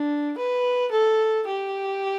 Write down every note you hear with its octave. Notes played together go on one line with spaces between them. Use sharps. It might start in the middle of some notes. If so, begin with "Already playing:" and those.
Already playing: D4
B4
A4
G4